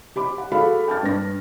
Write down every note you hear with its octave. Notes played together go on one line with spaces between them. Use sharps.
G4 B5 D6
F#5
F#4 G#4 A4 F5 B5
G5 A5 F6 A6
G2 B4 A#6